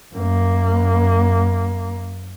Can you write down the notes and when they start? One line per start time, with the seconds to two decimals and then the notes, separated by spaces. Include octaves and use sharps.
0.13 F#2 A#3